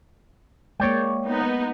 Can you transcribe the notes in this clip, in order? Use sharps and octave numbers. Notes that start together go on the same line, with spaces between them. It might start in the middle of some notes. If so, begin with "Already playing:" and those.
G#3 A#3 C#5 D5 G5
B3 D#4